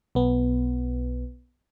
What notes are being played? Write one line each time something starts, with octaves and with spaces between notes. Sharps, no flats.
B1 B3